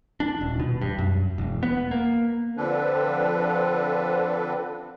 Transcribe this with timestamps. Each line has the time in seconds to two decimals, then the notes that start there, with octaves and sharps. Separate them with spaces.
0.20 D4
0.41 D#1
0.60 B2
0.81 G2
0.99 F#2
1.38 E1
1.63 B3
1.91 A#3
2.57 D3 F3 C4 D4 A4 B4